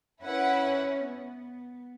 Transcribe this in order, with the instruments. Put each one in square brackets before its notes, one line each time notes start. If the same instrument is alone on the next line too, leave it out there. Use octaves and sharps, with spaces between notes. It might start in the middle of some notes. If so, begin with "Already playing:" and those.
[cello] C#4 [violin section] E4 B4 F#5
[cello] B3